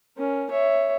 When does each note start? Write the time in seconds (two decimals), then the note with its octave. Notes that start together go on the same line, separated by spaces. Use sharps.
0.17 C#4 A#4
0.51 C#5 E5